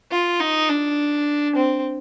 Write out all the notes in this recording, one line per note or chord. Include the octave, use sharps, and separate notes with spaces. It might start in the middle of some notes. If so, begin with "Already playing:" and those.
F4
D#4
D4
C4